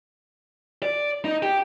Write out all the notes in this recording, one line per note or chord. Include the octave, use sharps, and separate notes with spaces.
D5
D#4
G4